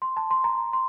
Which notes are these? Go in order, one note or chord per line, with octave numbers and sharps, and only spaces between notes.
C6
A5
C6
A#5
C6